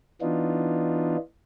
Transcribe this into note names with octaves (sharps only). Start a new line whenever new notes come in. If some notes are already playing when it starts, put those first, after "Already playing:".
E3 B3 D4 D#4 F4